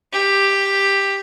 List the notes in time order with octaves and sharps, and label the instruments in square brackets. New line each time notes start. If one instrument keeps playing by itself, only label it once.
[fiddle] G4